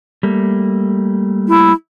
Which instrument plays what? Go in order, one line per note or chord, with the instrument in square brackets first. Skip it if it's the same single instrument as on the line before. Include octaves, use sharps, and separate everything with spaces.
[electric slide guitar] G3 A3 A#3
[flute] E4